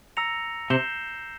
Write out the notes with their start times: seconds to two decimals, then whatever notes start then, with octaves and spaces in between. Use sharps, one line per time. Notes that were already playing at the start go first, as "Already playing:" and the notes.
0.17 A#5 E6 A#6 C#7 F7
0.70 C3 G6 C7 E7 G7